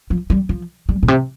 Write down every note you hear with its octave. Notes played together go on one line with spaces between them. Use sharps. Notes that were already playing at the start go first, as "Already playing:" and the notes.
F3
G3
F3
G3
A#2
C3